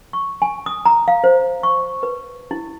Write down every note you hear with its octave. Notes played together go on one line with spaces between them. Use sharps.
C#6
G#5
D#6
A#5
F5
C5
C#6
B4
E4